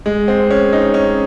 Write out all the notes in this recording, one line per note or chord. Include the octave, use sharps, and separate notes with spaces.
G#3
C4
C#4
D#4
C#4